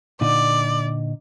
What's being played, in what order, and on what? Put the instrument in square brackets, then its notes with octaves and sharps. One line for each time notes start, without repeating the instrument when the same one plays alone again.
[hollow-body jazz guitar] A#2 D3 D#4 [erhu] D5